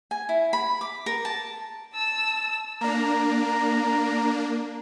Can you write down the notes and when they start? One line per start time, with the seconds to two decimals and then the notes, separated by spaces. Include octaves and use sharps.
0.11 G#5
0.29 E4
0.53 B5
0.81 D6
1.06 A#4
1.25 A5
1.93 A5 E6
2.81 A#3 D4 A#5